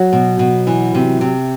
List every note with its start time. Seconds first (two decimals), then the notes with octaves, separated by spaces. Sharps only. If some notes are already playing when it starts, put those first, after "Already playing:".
Already playing: F#3 F#4
0.13 B2
0.39 B2
0.67 E3
0.94 C3
1.21 C3